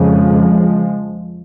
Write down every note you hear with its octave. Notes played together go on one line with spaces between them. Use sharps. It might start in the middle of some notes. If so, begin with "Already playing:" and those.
Already playing: F2 C#3 F3 G#3